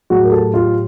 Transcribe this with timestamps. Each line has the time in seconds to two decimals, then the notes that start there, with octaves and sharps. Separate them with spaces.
0.10 A2 F#3 F#4 G#4
0.24 A#4
0.32 G4 A4
0.54 F4 G4